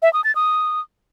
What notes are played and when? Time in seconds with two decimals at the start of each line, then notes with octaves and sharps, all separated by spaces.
0.02 E5
0.13 D#6
0.24 A6
0.35 D#6